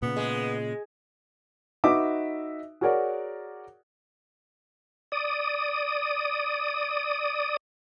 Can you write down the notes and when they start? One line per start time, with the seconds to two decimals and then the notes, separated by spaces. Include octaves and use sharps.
0.02 A#2 C#3 B3
0.16 G#3
1.84 D#4 F#4 B4 D#5 E5 D6
2.81 F#4 G#4 A#4 C#5 D5 F#5
5.12 D5 D#6